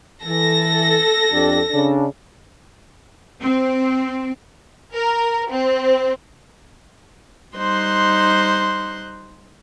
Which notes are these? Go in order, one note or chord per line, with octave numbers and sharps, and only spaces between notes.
E3 A4 A#6
F2 D4 G4
C#3 D4
C4
A#4
C4
G3 D#4 C5 C6 F#6